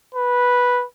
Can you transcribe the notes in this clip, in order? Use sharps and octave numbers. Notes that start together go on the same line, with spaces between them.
B4